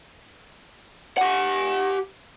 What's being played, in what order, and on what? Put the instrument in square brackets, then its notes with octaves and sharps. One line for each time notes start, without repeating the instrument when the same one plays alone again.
[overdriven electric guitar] G4 F#5